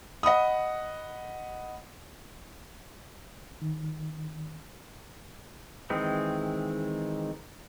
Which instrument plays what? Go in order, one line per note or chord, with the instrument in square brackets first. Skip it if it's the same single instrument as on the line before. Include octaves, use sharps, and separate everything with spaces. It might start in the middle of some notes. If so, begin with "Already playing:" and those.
[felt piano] D#5 F#5 B5 D#6
[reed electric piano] D#3
[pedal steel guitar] D#3 E3 G#3 C4